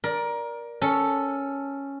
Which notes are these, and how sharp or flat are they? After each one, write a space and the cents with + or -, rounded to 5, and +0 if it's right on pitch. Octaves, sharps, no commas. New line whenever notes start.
A#4 +20 D5 +0
C#4 +0 A4 +0